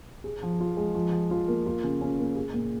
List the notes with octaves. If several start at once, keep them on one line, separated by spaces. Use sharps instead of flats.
G#4
F3
F4
G#3
F3
F3
F4
A#3
F4
C#3
C#4
A#3
G#4
A#2